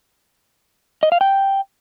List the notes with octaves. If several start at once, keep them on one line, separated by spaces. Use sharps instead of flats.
D#5
F5
G5